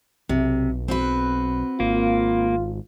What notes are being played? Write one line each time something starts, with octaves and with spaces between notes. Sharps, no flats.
B1 C3
C4 F#4 B4
G#1 A#3 F4